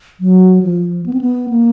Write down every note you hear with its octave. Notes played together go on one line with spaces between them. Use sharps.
F#3
F3
B3
C4
B3
A#3